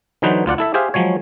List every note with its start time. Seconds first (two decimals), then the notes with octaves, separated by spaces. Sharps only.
0.22 D3 E3 F#3 D#4 B4 C5
0.46 D2 F4 D5 F#5
0.58 E4 A4 E5
0.74 G4 G#4 C5 E5 F5
0.94 F3 F#3 G#3 C#5